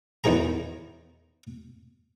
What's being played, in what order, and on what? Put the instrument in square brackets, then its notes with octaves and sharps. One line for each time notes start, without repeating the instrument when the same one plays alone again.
[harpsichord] E2 D#3 E3 G#4 A#5